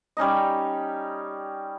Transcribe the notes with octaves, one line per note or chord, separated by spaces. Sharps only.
G3 C#4 D#4 D#5